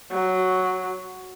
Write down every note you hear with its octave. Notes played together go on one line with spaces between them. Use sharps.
F#3